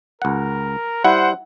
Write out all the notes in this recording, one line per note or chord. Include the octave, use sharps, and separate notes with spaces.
C#2 A#4 F#5
G3 E4 C5 F#5